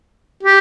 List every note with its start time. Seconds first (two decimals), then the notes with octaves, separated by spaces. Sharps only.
0.43 G4